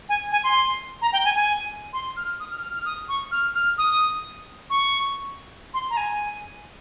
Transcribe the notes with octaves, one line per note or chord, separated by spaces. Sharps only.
G#5
G#5
C6
A#5
G5
G#5
G#5
C6
F6
D#6
F6
F6
F6
D#6
C#6
F6
F6
D#6
C#6
C6
A#5
G#5